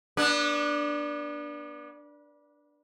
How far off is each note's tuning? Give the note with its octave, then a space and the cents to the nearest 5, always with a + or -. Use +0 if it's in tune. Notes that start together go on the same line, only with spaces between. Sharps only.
B3 -35 D4 +0